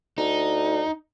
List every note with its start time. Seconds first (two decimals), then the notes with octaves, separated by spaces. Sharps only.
0.18 D2 D#4